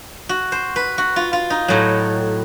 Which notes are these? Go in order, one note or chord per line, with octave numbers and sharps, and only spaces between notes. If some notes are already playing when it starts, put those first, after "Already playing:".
F#4
C5
B4
F#4
F4
F4
D#4
A2 F#3